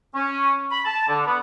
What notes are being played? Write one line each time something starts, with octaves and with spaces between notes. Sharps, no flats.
C#4
B5
A5
D3
B3